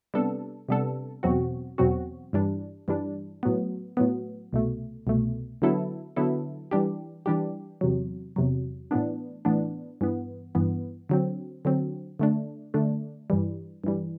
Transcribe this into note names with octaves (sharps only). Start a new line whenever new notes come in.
C3 G3 B3 D4 A4
C3 G3 B3 D4 A4
E2 B2 F#3 C4 F#4
E2 B2 F#3 C4 F#4
G2 E3 G3 D4
G2 E3 G3 D4
A2 F#3 B3
A2 F#3 B3
C2 B2 A3
C2 B2 A3
D3 F#3 B3 E4 A4
D3 F#3 B3 E4 A4
E3 G3 D4 G4
E3 G3 D4 G4
E2 C3 F#3
E2 C3 F#3
A2 E3 B3 D4
A2 E3 B3 D4
G2 E3 B3
G2 E3 B3
D3 F#3 C4
D3 F#3 C4
D3 A3 D4
D3 A3 D4
G2 E3 G3
G2 E3 G3